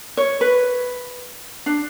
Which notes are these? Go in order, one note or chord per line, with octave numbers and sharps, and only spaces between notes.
C#5
B4
D4